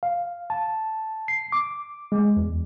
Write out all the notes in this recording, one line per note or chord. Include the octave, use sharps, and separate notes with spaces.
F5
A5
C7
D6
G#3
E2